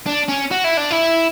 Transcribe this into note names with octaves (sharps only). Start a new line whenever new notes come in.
D4
C#4
F#4
E4
D4
E4